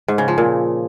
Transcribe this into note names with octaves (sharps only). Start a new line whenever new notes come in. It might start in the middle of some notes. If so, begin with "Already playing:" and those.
G#2
C#3
F3
A#2